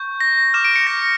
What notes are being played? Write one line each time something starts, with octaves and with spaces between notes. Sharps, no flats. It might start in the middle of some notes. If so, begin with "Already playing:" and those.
Already playing: C#6 G6
A#6
D6 F6 E7
D7
C#7
A#6